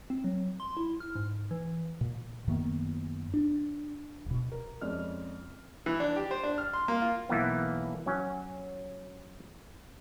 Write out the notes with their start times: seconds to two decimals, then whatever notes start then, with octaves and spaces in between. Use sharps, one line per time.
0.10 C4
0.24 F#3
0.60 C6
0.77 E4
1.00 F6
1.15 G#2
1.51 E3
2.01 A#2
2.47 F#2 D#3 A#3 B3
3.34 D4
4.26 D1 B2
4.52 A#4
4.81 F2 G#3 C#4 D5 F6
5.86 E3
6.00 D4
6.16 G4
6.31 C5
6.43 D4
6.58 F6
6.73 C6
6.88 A#3
7.02 F4
7.29 B1 E3 A#3 B3
8.06 F#3 C#4